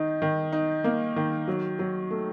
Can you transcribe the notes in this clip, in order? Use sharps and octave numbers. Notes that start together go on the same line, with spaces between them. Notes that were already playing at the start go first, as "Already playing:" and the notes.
Already playing: D#3 D#4
D#3
D#4
A#3
D#3
F#3
F#3
A3